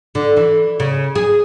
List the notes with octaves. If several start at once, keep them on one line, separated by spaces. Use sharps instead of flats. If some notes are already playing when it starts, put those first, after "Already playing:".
D3
E3
C#3
G#4